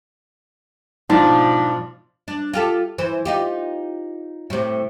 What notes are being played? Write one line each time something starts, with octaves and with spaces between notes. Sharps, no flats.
G#2 B2 F3 D4
D4
F4 G4 A4
E3 C5
D#4 F4 G4
A2 C3